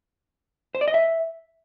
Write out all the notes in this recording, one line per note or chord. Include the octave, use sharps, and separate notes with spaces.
C5
D5
D#5
E5